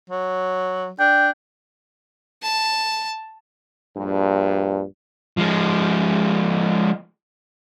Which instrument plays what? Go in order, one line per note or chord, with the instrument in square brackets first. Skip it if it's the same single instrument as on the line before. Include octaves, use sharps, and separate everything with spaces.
[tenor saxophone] F#3
[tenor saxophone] D4 [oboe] G5
[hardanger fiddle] A5
[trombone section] A#1 G2
[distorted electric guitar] F3 G#3